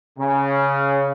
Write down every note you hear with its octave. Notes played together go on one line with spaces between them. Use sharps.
C#3